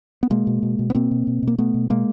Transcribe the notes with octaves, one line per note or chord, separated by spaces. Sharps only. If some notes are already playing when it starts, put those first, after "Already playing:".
B3
B2 G#3 A#3
B2
B2
B2
B3
B2 A#3 C4
B2
B2
B2 A#3
B2 A3 B3
B2
B2 G#3 A#3